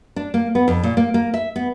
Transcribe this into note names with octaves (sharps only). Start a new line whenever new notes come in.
D4
A#3
B3
F2
A#2
A#3
A#3
E5
B3